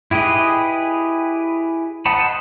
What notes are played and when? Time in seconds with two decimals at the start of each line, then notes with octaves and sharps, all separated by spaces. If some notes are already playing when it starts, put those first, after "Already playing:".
0.11 E4 G4 G#4 B4 D#5
2.06 C5 D#5 F#5 A5 B5